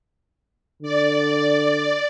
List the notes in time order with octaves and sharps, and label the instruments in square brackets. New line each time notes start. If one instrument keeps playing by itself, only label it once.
[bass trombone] D3 [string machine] D5